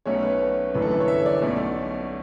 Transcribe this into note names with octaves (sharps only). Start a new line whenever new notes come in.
B1 B2 A3 C#4 C#5
B4
G1 F#2 E3 A3 D4 B4
A4
B4
C#5
E5
D5
B1 B2 A3 C#4